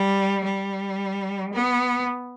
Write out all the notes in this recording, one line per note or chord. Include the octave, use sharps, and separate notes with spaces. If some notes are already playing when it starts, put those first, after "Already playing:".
Already playing: G3
G3
B3